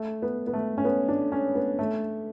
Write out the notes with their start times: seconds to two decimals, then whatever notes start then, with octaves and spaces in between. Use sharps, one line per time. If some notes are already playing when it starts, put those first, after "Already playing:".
Already playing: A3
0.22 B3
0.47 B3
0.53 A3
0.78 C#4
0.85 B3
1.08 D4
1.32 C#4
1.55 B3
1.79 A3